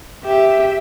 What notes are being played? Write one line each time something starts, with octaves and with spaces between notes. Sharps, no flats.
G4 E5